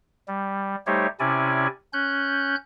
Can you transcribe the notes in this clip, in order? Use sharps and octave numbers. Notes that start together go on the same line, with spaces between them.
G3
G3 A3 D#4 G4 C5 C#5
C3 C#4 E4 D5 G#5
C#4 F#6 G6